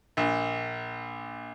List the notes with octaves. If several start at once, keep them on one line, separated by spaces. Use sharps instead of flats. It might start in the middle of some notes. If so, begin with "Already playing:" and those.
A#1